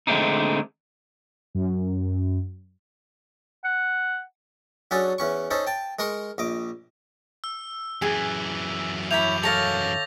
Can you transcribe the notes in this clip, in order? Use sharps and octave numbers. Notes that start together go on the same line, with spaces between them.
D3 G#3 A3 C4 D4 D#4
F#2
F#5
F#3 C#4 D4 G#4 A4
E2 C#4 C#6
C#4 D#4 A4 C5
G5 A5
G#3 A#4 A#5 C6 C#6
A#1 D#5 D6
E6
F#2 E3 G#4
E4 C#5 B5 D6 G6 F7
A4 C#5 F5 A6 A#6 F7